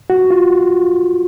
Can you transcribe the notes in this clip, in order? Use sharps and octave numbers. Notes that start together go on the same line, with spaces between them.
F#4
F4